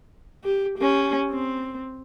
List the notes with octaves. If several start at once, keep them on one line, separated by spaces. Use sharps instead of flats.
G4
C#4 G4
C4